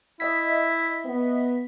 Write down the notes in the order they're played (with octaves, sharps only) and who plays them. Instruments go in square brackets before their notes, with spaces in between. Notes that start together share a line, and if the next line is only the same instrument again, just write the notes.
[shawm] E4 [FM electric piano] D#5 E5 B6
[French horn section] B3